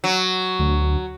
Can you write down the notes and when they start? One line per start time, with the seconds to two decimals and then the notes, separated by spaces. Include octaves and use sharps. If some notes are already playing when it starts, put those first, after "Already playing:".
0.04 F#3
0.59 D2